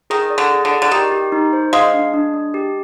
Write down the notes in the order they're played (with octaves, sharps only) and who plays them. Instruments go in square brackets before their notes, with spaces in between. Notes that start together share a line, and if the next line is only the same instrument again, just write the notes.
[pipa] D#3 [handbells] G#4
[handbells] D5
[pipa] D3
[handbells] G#4
[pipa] D3
[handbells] D5
[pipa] D3
[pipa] D#3 [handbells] G4
[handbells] G4
D#4
C5
[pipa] G#3 [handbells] F5
[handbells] D4
D4
D4
G4